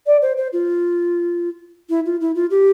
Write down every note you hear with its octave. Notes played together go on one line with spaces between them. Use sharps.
D5
C5
C5
F4
E4
F4
E4
F4
G4